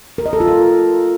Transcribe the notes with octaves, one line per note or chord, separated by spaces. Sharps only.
A#4
D#5
A4
F4
A#4